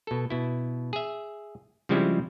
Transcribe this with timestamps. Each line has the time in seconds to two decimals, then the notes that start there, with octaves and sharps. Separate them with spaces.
0.07 B2 A4
0.30 B2 E4
0.93 G#4 E5
1.89 C#3 F3 G3 G#3 C4 E4